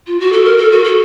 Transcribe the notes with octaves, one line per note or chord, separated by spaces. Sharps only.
F4
F#4
A4
A#4
A4
F#4
A4